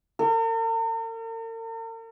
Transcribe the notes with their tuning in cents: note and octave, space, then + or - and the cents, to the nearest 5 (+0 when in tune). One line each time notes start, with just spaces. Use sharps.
A#4 -45